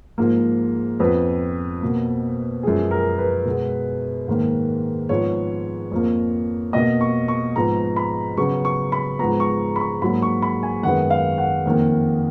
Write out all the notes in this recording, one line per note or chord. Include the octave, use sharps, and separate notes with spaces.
G#2 F3 A#3
F2 F3 B3 B4
B2 A#3
F#2 F3 G#3 G#4
A#4
B4
B2 G#3 B3
G#2 D#3 A#3
G#2 F3 B3 C#5
F2 F3 A#3
B2 A#3 D#5
C#6
C#6
G#2 F3 B3 A#5
B5
C#3 F#3 B3 C#6
C#6
B5
G#2 F3 G#3 B3 A#5
C#6
B5
C#6
G#2 F#3 A#3 B5
C#6
B5
G#5
F#2 D#3 G#3 B3 F#5
F5
F#5
F2 D#3 A#3